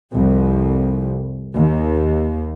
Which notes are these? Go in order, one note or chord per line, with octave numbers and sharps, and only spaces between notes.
C2 F2
D#2